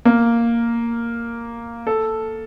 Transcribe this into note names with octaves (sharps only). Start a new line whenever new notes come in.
A#3
A4